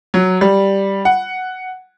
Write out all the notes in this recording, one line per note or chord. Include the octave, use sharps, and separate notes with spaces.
F#3
G3
F#5